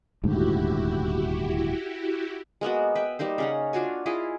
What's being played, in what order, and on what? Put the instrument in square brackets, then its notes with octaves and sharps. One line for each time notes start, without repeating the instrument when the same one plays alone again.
[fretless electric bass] D#1 D2 G#2 [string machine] E4 F#4 G4
[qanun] G#3 A#3 B3 F#4
B4 E5 G5
G3 A#3 D#4 C5
C#3 C#4 F#5
D4 F4 F#4 G#5
E4 F4 G#4 D#5